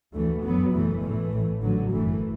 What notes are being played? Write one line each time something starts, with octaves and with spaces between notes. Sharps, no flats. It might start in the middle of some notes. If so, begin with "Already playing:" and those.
D2 E3 A3
F#1 F#2 F#3 B3
F#1 E2 B2 E3 A3
A1 A2 E3 A3
A1 A2
A1 A2 D3 F#3
F#1 F#2 E3 A3